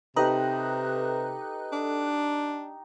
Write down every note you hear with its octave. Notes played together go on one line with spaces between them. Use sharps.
C3 D#4 G4 A4 B4 F#6
D4